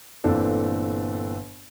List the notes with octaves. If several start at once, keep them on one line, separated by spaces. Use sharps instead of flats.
G1 A#2 E3 C4 D4 A4